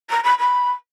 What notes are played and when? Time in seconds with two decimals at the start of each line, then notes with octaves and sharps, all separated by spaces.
0.09 A#5
0.23 B5
0.38 B5